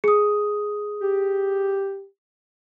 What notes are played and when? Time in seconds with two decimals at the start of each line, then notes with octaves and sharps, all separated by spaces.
0.04 G#4 D#6
1.02 G4